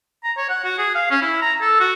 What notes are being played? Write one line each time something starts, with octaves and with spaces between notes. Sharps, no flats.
A#5
C#5
F#5
F#4
G#4
F5
C#4
E4
A#5
A4
F#4